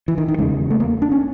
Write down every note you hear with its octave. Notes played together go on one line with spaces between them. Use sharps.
E3
D#3
D#3
E2 C#3 G#3
A3
A#3
D4
C#4